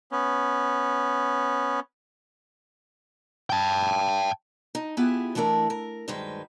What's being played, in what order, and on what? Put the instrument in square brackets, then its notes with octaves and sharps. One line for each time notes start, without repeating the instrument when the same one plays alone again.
[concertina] B3 C#4
[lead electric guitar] G5 A5
[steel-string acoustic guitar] D#4
B3 E4 F4 G4 G#4 G#5
E3 A3 D4 E4 A#4
A#4
D2 G2 D#3 G#3 B4 C5